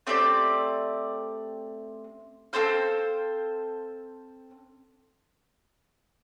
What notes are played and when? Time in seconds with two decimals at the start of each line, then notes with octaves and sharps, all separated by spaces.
0.07 A3 C4 G4 D5
2.53 C4 A4 C5 F5